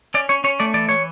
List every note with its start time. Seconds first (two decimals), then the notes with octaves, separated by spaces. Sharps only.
0.14 C#4 D5
0.29 C#4 C#5
0.44 C#4 C#5
0.60 A3 D5
0.74 E3 D5
0.89 E3 C#5